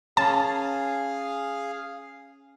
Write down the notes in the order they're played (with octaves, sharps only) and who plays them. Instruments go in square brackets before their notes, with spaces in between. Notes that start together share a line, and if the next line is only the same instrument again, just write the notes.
[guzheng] C#4 [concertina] G#4 F5 [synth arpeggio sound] A5